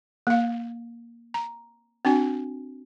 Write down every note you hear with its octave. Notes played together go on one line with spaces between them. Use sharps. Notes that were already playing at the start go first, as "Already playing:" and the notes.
A#3 F5
A#5
C4 D4 F#4 G#5